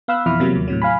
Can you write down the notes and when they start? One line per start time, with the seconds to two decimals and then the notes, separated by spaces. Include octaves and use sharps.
0.08 B3 F5 B5 E6 F#6
0.26 F2 B2 E3 E5 B5 F6
0.40 C3 F3 F#3 A#3
0.56 D#2
0.68 A2 C3 F#3
0.82 F5 G#5 B5